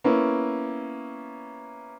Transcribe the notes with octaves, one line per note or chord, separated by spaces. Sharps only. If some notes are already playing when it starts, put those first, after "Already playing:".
A#3 B3 C#4 E4